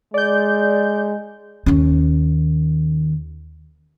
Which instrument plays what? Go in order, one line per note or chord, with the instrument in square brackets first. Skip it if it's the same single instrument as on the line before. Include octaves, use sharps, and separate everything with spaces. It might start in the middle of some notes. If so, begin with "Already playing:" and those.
[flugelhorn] G#3 [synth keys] D5 G6
[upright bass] D#2 C#4